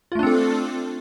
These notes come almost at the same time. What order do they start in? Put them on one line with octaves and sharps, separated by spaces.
F4 A3 D4 C4 A4